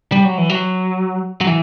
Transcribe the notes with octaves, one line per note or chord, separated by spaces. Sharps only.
G3
F#3
E3
F#3
F#3
E3